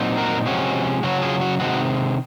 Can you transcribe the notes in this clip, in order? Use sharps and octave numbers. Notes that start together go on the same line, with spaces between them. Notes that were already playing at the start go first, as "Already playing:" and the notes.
Already playing: A#2 F#3 C4 D#4
F#4 A#4
C3 F3 G#3 C#4 F#4
C#3 F#3 C#4 F#4
F4 G#4
F#4
C3 D#3 G#3 F#4